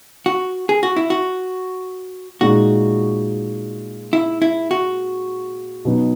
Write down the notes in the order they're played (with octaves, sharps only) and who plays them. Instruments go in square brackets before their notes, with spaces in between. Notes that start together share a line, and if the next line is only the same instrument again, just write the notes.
[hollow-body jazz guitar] F#4
G#4
F#4
E4
F#4
[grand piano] A#2 G#3 D#4 [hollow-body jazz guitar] F#4
[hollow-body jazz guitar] E4
E4
F#4
[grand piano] B2 F#3 B3 D#4